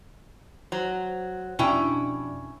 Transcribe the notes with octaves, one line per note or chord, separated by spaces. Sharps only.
F#3 C5
F2 B2 C#4 D4 E4 G5